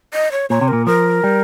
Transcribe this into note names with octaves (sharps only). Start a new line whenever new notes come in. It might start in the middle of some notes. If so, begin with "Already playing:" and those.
D#5
C#5
A#2 C#5
C3
A#2 A#4
F3 A#4
G3